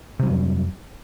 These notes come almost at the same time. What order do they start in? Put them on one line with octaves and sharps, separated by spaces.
C3 G3 F#3 F2